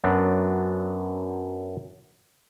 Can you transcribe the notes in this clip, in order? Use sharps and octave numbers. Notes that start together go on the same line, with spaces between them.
F#2 F#3 B3 D4